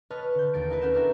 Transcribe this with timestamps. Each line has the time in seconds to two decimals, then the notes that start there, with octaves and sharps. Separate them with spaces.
0.10 B4 C#5 D#5 A5 F6 F#6
0.35 D3 G6
0.53 E1 D#2 A#3 A6 C#7 D7
0.70 A#3 D#4 E4 A#4 B4
0.81 A3 C#4 E4 F#5 G6 E7
0.94 B3 D4 F#4 A#4 E5